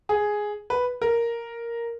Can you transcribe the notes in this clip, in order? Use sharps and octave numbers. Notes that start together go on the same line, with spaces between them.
G#4
B4
A#4